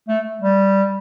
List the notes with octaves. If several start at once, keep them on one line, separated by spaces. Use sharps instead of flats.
A3
G3